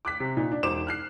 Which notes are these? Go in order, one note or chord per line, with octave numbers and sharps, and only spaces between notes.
D6 F#6 B6
C3
A#2 D#4
D4
E1 D#4 C5 D6 E7
F6 F#6 C7